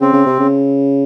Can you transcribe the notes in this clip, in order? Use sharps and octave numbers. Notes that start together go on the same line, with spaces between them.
C#3 C4
C#3
C3
C#3